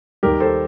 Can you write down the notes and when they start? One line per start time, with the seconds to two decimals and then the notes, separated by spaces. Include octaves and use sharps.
0.23 D#2 D#3 G3 G4 A#4
0.40 A4 C5